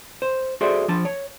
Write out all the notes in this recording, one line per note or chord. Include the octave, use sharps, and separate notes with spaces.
C5
F#4 G#4 A4 C5 D5 E5
F3 D4 A5
C#5